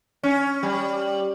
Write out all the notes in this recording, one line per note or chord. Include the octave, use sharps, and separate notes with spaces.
C#4
G3